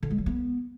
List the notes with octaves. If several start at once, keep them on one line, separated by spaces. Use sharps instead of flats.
D3
G#3
F#3
B3